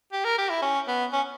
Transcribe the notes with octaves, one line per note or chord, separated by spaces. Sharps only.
G4
A#4
G4
E4
C#4
B3
C#4